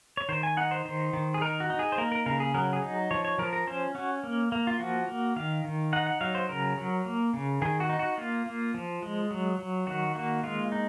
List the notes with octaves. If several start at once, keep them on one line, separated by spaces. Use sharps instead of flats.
C#5
D#3 C5
G#5
D#4 F#5
C5
D#3 C5
D#3
G#4
D#4 A#4
F#4
D#4
G#4
C5
A#3 A#4
A#4
C#3 A#4
G#4
F#3 A#4
G#4
D#4
F3 C#5
C#5
F3 A#4
A#4
C#4 C5
C#4 F#4
A#3
A#3
F4
F3 F#4
A#3
D#3 F5
D#3
D#4 F#5
F#5
F#3 F5
C5
C#3 A#4
F#3
A#3
C#3
D#3 G#4
F#4
D#4
F#4
A#3 F4
A#3
F3
G#3
F#3
F#3
D#3 F#4
A#3 F#4
G#3 F4
D#4